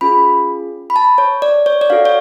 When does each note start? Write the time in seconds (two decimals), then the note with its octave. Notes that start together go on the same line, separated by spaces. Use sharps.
0.01 C#4 F4 G#4 B5
0.90 B5
0.96 A5
1.18 C#5
1.42 D5
1.66 C#5
1.81 D5
1.90 D4 F#4 A4 F5
2.05 C#5